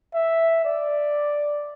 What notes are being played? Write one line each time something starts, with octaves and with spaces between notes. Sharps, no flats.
E5
D5